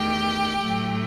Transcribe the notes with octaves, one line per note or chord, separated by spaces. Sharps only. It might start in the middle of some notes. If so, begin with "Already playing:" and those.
Already playing: E2 D#3 A3 G4 G5
A2 F#3 A3